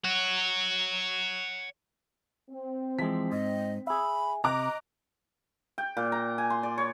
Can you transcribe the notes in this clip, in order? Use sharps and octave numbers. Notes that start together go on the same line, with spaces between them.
C#5 F#5
C4
E3 F3 G#3 B6
G#2 D#5
G#4 E5 B5
C3 D#5 A#5 D6 F#6
G5
A#2
A#5
G#5
C6
D5
C#5